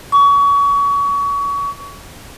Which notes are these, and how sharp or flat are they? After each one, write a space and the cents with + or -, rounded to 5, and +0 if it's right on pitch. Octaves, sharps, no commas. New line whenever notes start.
C#6 +30